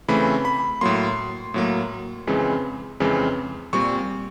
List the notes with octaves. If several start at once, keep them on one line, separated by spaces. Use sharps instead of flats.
C#3 E3 A3 C4 B5
B5
A2 F#3 A#3 C6
A2 F#3 A#3
F2 C#3 E3 G#3 C4
F2 C#3 E3 G#3 C4
A#2 G3 C4 C#6